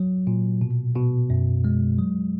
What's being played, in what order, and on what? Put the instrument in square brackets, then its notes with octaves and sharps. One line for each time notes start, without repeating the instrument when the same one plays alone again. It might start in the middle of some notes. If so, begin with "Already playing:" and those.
Already playing: [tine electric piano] F#3
A#2
B2
B2
F#2
G#3
F#3